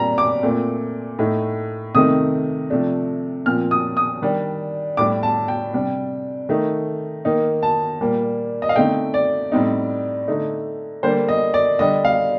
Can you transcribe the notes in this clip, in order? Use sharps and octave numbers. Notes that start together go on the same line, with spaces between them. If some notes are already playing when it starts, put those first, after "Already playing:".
Already playing: A#2 G3 C4 A#5
D6
A#2 A3 C4
A2 A3 D#4
C3 D#3 A3 C4 D#4 D#6
C3 F3 A3 D4
A#2 F3 C4 F6
D#6
D#6
D#3 G3 D4
A2 G3 D4 D6
A5
G5
C3 G3 D4
D#3 A3 D#4
D#3 A#3 D#4
A5
A#2 G3 A#3
D#5
F5
D3 A3 C4 D#4 G5
D5
A2 G3 C4 D#4
D3 A3 D#4
D3 G3 A#3 D4 C5
D#5
D5
D3 G3 D4 D#5
F5